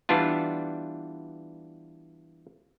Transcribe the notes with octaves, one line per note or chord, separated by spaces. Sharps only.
E3 G3 B3 D4 F4